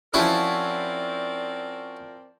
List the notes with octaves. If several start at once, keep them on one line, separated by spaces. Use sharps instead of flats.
F3 C4 C#4 E4 F#4 A#4 D5